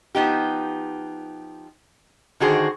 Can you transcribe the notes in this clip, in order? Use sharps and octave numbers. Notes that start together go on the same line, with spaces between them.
F3 B3 D#4 G4
D3 D#3 F#4 G#4 C5